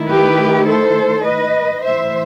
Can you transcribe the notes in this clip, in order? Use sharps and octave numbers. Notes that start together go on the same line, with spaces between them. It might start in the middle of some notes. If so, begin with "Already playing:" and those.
Already playing: D#3 A3 E4
G4 B4
A4 C5
B4 D#5
A2 E3 A3 E4 C5 E5